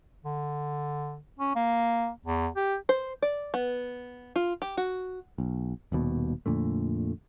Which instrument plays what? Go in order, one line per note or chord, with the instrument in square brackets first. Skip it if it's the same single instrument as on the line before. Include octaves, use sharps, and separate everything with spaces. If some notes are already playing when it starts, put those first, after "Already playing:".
[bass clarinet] D3
C#4
A#3
E2
G4
[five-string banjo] C5
D5
B3
F4
G4
F#4
[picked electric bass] B1
D#1 D#2 B2
F2 A#2 D3 A3